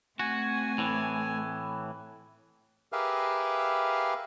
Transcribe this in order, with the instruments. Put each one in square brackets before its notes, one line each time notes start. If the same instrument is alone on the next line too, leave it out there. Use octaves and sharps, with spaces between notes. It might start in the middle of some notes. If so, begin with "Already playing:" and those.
[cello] A3 C4 [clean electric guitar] F#4 [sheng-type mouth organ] G#5
[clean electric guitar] A2 E3
[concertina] G4 G#4 A#4 B4 E5 F5